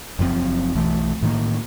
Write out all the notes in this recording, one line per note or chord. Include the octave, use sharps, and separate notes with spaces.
F#1 F#2 F3 C4
B1 E3 A3
A2 D#3 A#3